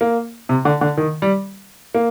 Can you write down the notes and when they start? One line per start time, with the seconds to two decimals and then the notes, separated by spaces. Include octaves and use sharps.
0.01 A#3
0.49 C3
0.65 D3
0.81 D3
0.97 D#3
1.22 G3
1.95 A#3